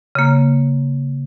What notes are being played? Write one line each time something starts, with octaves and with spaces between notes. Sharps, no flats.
C#3 A#3